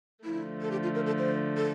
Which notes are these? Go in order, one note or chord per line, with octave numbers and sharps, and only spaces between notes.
D3 F3 A3 E4
A4
G4
F4
A#4
A4
C5
A4